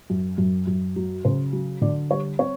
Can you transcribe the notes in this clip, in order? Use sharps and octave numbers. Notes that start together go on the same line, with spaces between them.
F#2
F#2
F#2
F#3
C#3 C5
F#3
D3 D5
G3 C#5
C4 C#5